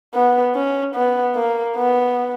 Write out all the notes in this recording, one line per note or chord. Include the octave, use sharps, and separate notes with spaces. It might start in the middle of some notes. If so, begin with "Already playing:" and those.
B3
C#4
B3
A#3
B3